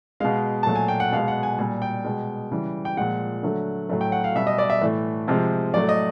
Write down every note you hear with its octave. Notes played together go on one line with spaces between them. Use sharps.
B2 G#3 F5
A#2 F#3 A3 A5
G#5
G5
F#5
B2 G#3 F5
F#5
G#5
A#2 G3 G#5
G5
B2 G#3
C#3 E3 G3
G5
A#2 F3 G#3 F#5
D3 F#3 A3
A2 F#3 A3
G5
F#5
F5
B2 G3 E5
D#5
D5
E5
A2 E3 A3
C3 F3 G#3
A2 F#3 A3 D5
D#5